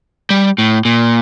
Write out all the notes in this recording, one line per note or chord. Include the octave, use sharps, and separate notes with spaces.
G3
A2
A#2